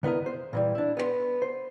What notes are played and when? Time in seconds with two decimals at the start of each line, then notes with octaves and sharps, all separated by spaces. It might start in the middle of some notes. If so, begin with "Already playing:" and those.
0.03 D3 B3 E4 A#4 D#5
0.26 C5
0.53 A#2 E3 G3
0.75 D4 E4
0.97 B3 C#5 C6
1.42 C5